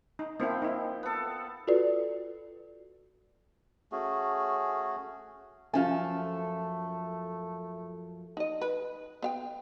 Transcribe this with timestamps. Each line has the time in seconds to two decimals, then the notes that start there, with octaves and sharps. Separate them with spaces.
0.19 D#4
0.40 F3 A#3 C4 E4 G5
0.62 D#4 E4
1.03 B3 A4
1.67 F4 F#4 A4 B4 D5
3.92 A3 C#4 F#4 G#4
5.74 F#2 F3 A3 C#4 F4 A4 E5 G#5
8.37 D#4 D#5
8.61 B4
9.22 B3 F5 G5